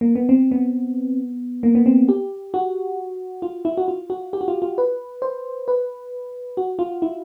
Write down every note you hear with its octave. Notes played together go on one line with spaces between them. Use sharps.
A#3
B3
C4
B3
A#3
B3
C4
G4
F#4
F4
E4
F#4
F4
F#4
G4
F#4
F4
F4
B4
C5
B4
F#4
F4
E4